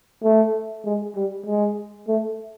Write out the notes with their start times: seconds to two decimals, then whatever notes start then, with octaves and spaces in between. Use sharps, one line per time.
0.24 A3
0.85 G#3
1.16 G3
1.46 G#3
2.08 A3